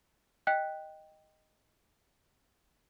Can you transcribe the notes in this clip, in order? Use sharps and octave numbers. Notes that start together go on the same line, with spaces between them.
D#5 G5 F#6 B6